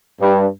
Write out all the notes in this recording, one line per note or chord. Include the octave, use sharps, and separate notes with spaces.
G2